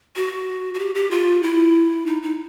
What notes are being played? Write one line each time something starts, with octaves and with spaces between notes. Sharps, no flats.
F#4
F#4
G4
G4
F4
E4
D#4
D#4